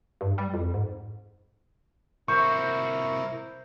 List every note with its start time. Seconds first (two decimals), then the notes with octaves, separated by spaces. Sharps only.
0.21 G2
0.38 G3
0.54 F2
0.74 G#2
2.28 C2 E4 F#4 A#4 C5 C#6